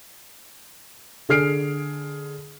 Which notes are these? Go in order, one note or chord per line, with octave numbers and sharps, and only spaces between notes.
D3 G#4 F6 C7 D7